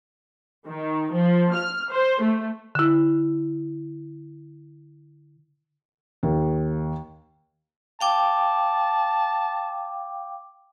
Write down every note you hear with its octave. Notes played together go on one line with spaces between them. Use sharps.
D#3
F3
F6
C5
A3
D3 E4
D#2
F5 G5 A5 D6